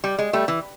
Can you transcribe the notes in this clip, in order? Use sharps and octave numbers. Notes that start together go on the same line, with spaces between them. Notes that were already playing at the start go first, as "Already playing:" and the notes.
G3
G#3
G3 A3
E3